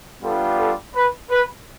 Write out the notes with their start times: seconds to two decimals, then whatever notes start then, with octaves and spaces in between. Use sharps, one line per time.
0.22 G3 B3 D4 F4 A4
0.58 A4
0.95 B4
1.30 B4